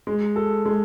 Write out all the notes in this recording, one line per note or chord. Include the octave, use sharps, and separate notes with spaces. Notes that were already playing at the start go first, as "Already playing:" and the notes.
G#3
A4
G#3